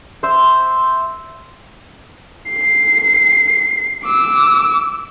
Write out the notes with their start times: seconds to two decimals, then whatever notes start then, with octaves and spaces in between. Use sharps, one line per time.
0.23 C5 E5
2.50 C7
4.05 D6 E6